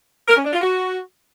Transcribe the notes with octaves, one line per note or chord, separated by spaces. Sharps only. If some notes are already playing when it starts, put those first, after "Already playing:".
A#4
C#4
D4
F4
F#4